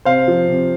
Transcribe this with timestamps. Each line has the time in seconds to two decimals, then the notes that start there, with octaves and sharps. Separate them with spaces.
0.05 C3 C5 F5
0.28 F3
0.48 C3